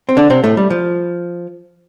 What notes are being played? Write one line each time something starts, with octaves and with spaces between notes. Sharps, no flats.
C4
D3 D4
C3 C4
A2 A3
G3
F3